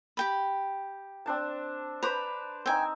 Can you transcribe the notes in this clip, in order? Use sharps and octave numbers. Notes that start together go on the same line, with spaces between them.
G4 G5 B5
C4 D4 A5
B4 C5 A#5 B5 D6
C4 D#4 G5 G#5